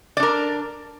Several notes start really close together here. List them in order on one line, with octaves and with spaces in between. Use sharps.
D5 D4 A#4